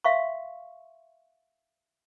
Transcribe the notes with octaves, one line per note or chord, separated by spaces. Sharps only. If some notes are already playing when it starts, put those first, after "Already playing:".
E5 F5 C6 C#6